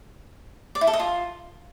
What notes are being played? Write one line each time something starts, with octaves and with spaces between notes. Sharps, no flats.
D5
E4
A4
D#5
F4